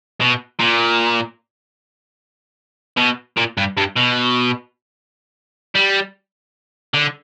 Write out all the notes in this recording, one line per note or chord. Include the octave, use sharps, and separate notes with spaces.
B2
A#2
B2
A#2
G2
G2
B2
G3
D3